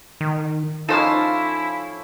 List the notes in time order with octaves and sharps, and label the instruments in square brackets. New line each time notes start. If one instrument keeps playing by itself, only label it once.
[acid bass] D#3
[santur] F3 C#4 D5 [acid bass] D#4 [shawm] E4 [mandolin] A4 C5 F5